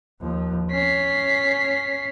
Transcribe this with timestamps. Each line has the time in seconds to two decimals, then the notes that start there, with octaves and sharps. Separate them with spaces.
0.21 D#2 F3
0.71 C#4 B6 C7